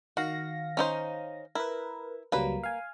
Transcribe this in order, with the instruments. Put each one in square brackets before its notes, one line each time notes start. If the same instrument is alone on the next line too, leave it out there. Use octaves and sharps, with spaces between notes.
[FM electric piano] D#3 F5 A#6 [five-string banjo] F#4
[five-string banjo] C#4 D#4 C5
[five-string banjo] E4 [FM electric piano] A#4 B4
[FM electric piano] C#2 F#3 G3 [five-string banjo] A#3 B4
[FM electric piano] F5 G#5